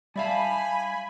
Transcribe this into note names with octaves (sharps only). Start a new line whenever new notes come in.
G3 D5 E5 F5 G#5 A5 B5